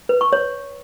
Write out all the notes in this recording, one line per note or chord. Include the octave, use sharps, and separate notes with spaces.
B4
C#6
C#5